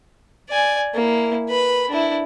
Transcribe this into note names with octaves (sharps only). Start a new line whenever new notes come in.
D5 G#5
A#3 E4
B4 B5
D4 E4